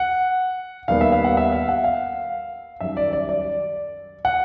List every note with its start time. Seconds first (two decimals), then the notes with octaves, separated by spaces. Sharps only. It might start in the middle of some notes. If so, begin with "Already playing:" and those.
Already playing: F#5
0.88 D#2 D#3 G3 B3 F5
1.01 E5
1.12 F5
1.24 F#5
1.37 E5
1.52 F5
1.69 F#5
1.84 F5
2.80 F#2 D#3 G3 E5
2.97 D5
3.13 D5
3.29 D5
4.25 F#5